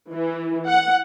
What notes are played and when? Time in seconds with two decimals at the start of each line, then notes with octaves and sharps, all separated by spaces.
0.13 E3
0.68 F#5